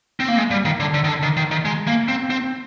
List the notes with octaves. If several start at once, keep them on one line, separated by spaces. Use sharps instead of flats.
C4
A#3
G#3
G3
D#3
D3
D3
D#3
D3
D#3
D#3
D#3
G#3
A#3
C4
C4